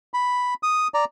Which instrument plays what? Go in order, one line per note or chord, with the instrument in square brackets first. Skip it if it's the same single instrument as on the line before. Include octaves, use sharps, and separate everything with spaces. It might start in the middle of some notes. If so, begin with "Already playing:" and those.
[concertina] B5
D#6
D5 A#5